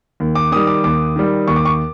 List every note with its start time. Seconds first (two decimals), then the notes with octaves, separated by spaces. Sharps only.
0.20 D#2
0.35 D6
0.52 D#3 D#6
0.56 G3
0.67 D6
0.84 D#2 D6
1.16 D#3 G3
1.47 D#2 C#6
1.56 D6
1.65 C#6